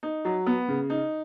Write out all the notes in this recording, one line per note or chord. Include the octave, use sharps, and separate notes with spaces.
D#4
F#3
B3
C#3
D#4